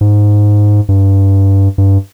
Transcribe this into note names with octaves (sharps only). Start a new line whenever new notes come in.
G#2
G2
G2